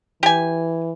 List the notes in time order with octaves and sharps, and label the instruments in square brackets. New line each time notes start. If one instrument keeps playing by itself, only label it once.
[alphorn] E3 [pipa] G4 G#5